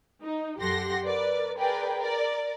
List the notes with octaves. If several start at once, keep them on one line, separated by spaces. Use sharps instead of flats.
D#4
F#2 G4 A4 F#5 C6 A#6
A#4 B4 D5
G#4 A#4 B4 D5 G5
A#4 D5